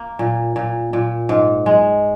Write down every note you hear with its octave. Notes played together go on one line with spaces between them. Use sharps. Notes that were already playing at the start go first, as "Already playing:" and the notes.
Already playing: A#3
A#2
A#2
A#2
G#2
G#3